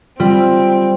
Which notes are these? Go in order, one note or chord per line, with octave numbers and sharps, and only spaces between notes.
G3 C4 F4